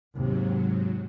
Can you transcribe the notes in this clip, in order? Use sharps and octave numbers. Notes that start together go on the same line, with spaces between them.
D#2 G#2 C3 F#3